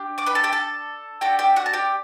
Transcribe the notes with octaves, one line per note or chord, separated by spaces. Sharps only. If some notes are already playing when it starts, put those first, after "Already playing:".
Already playing: D4 G4
D5 D6
B4 B5
A4 A5
G4 G5
A4 A5
D4 F#4 G4 A4 G5
G4 G5
F#4 F#5
A5
G4 G5